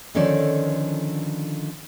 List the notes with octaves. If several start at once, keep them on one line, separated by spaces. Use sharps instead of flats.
D3 D#3 F3 C#4 A4 D5